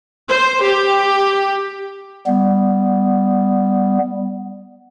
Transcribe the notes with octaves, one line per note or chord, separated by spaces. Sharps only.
C5
G4
G3 B3